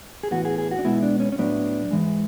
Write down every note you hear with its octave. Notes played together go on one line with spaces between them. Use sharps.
G#4
A2 E3 B3 F#4
G#4
G#4
F#4
D4
B2 G#3 B3 E4
D4
C#4
C#4
A2 F#3 B3 D4
G#2 E3 G#3